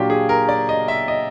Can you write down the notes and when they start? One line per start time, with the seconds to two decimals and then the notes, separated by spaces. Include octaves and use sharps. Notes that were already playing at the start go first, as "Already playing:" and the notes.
Already playing: A#2 F#3 A#3 D4 F4 G4
0.10 G#4
0.29 A#4
0.49 D5
0.69 D#5
0.88 E5
1.08 D#5